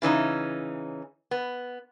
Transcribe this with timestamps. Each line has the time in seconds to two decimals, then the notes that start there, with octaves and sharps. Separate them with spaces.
0.02 C#3 E3 C#4 D#4
1.31 B3